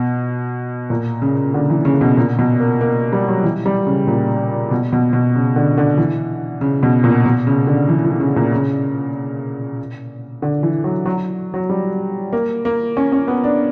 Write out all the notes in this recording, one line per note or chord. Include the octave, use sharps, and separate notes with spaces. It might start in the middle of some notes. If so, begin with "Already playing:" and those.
Already playing: B2
A#2
C#3
D3
E3
C#3
B2
A#2
B2
A#3
A#3
G3
F#3
E3
G3
C#3
A#2
B2
B2
B2
C#3
D3
D3
E3
C#3
B2
A#2
B2
C#3
D3
E3
E3
C#3
A#2
C#3
D3
E3
F#3
F#3
F#3
G3
A#3
A#3
C#4
C#4
B3
D4